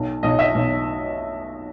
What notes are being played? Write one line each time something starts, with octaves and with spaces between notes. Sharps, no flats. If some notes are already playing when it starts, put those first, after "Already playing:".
Already playing: B1 B2
B1 B2 D#5
E5
B1 B2